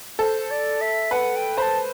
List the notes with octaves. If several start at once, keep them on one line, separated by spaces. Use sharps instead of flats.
A4 C5
D5
E5
B4 F#5
G5
C5 A5 B5